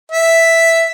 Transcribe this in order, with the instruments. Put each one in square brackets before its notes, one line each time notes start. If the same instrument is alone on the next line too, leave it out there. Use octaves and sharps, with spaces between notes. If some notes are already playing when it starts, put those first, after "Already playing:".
[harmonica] E5